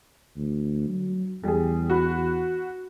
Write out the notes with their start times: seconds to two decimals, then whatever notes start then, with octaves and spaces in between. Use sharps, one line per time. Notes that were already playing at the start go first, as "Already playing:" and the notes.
0.37 D2
0.89 F#3
1.44 E2 G3 G#4
1.90 F#4 B5